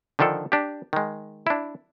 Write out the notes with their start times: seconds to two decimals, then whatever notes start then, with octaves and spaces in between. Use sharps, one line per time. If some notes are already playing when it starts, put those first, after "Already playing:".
0.19 D3 D#3 F3 D4 A4
0.52 D4 G4
0.93 D#3 G#3
1.47 D4 E4